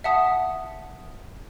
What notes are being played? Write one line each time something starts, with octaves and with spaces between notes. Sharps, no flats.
E5 F#5 A5 D#6